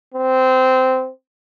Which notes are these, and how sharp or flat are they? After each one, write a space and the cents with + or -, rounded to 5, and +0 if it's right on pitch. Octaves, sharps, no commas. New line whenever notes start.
C4 -15